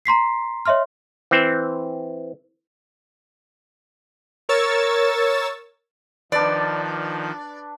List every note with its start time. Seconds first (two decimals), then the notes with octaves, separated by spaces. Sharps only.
0.05 A#5 C6 B6 C7
0.66 C#5 D#5 E5 C6 F6
1.31 E3 C4
4.49 A#4 C#5 C#6 E6 A6
6.32 D#3 F3 D4 B4 D5